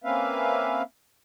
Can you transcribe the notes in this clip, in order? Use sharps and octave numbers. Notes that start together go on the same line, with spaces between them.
A#3 C4 C#4 B4 E5 F5